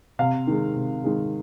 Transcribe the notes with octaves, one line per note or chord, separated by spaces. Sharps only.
C3 F5
D#3 G#3
C3
D#3 G#3